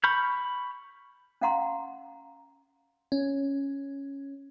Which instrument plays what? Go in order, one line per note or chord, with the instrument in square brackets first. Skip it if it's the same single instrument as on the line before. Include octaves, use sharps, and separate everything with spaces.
[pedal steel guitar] B5 C#6 F6 G6
[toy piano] C#4 F5 F#5 A#5 C6
[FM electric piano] C#4